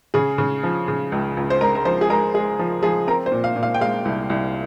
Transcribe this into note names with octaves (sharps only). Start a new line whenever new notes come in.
C#3 G#4
C#3
F3
C#3
C#2
C#2
C5
G#3 A#4
A#4
F3 C5
G#4
G#3 A#4
G#3 G#4
F3
F3 G#4
C4 A#4
C5
A#2
F5
A#2
F5
G5
G#3 F5
C2
C2